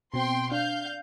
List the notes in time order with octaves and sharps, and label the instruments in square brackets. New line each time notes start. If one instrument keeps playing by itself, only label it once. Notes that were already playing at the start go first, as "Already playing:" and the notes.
[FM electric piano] B2 C4 [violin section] G5 C6
[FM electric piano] D4 [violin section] F5 G6